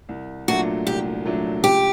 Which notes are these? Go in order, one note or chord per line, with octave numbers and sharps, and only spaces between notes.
C2
A#2 F#3 A3 D4 F#4
C2 G4
A#2 F#3 A3 D4
C#2 G4